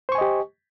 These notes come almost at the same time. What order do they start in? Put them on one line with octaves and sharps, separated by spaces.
C5 C#6 G#5 D#5 G4